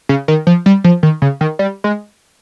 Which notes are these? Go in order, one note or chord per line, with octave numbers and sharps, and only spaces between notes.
C#3
D#3
F3
G3
F3
D#3
C#3
D#3
G3
G#3